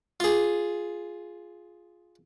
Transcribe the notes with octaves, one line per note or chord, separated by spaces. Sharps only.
F4 G#4